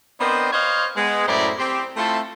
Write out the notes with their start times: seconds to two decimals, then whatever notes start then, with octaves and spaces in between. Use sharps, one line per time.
0.21 B3 C4 D4 A#4 C5 D#5
0.53 C5 C#5 D#5 F5
0.96 G#3 B3
1.27 F#2 A2 E4 C5 D5 A#5
1.58 C4 G4
1.97 A3 C4 E4 F4 A4